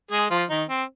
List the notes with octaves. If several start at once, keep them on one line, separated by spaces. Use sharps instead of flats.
G#3 G#4
F3 F4
D#3 D#4
C4